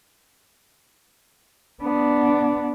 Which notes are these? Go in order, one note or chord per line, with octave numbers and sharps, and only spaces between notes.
B3 D4